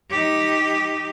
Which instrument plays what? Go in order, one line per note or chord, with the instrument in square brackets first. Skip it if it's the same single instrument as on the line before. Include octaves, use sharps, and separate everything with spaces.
[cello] D#4 G4